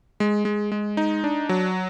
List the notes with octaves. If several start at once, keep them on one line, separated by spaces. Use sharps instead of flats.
G#3
G#3
G#3
D#4
D4
F#3